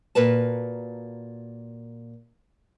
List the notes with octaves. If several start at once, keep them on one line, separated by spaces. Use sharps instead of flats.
A#2 F#4 A#4 B4 A5